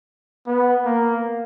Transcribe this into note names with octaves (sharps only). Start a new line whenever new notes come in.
B3
A#3